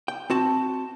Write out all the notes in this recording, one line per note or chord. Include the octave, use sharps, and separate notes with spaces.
G5
C4 F#4 A5